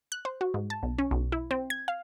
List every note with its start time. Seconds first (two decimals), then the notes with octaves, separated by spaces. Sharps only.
0.12 F#6
0.25 C5
0.41 F#4
0.54 G#2
0.70 A5
0.83 B1
0.98 C#4
1.11 B1
1.32 E4
1.51 C4
1.70 G#6
1.88 F5